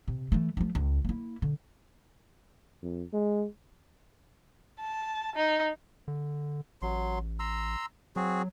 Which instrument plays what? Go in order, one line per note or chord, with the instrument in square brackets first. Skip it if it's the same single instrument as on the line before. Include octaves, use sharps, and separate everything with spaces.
[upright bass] C3
E3 A3
F3 A3
C#2
A#3 E4
D3
[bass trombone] F2
G#3
[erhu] A5
D#4
[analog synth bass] D3
[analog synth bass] A1 [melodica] F#3 C6
[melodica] A#5 C6 E6
[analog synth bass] F#3 [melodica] C4 F#4 G#4